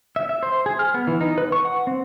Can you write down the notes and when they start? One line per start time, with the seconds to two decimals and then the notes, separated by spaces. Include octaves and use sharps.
0.16 E5
0.29 E5
0.43 C5
0.66 G#4
0.79 F6
0.94 B3
1.07 E3
1.21 D#4
1.38 B4
1.52 C#6
1.65 F#5
1.87 C4